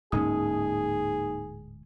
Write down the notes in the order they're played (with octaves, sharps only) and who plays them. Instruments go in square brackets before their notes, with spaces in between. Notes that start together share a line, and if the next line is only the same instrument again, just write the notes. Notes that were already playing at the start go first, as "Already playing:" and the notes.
[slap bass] D1 G#2 C#4 [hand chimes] A#3 D#4 D#6 [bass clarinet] G#4